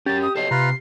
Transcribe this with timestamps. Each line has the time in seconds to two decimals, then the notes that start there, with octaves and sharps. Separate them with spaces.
0.06 C#4 G4 A#4 A6
0.21 D#6
0.36 A4 C#5 D#5 C7
0.51 C3 F4 B4 A#5